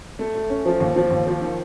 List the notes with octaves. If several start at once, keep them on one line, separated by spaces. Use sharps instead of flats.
A3
A3
C#4
F3
D#2
F3
D#2
F3
D#3